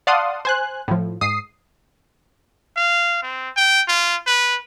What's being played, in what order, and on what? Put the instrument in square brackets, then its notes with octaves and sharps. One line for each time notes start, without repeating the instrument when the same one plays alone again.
[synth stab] D5 F5 F#5 A5 C6 D#6
C5 G#5 F#6
A2 F3
G#2 D#6 C7
[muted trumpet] F5
C4
G5
F4
B4